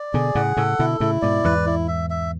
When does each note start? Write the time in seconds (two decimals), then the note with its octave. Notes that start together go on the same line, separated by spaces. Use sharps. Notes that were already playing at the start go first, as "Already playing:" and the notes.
Already playing: D5
0.14 B2 D3 G#4
0.35 A2 C#3 F#5
0.57 A2 C#3 A4
0.79 B2 D3 E4
1.00 A2 C#3 E4
1.22 G#2 B2 D5
1.44 E2 G#2 B4
1.66 E4
1.88 E5
2.10 E5